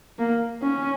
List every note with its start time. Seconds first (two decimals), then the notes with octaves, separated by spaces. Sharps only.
0.19 A#3
0.61 C#4